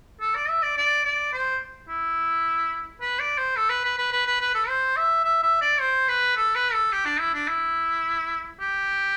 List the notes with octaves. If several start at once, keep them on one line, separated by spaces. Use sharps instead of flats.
A4
D5
E5
D5
D5
D5
C5
E4
B4
D5
C5
A4
B4
B4
B4
B4
B4
B4
A4
C5
E5
E5
E5
D5
C5
B4
A4
B4
A4
G4
D4
E4
D4
E4
G4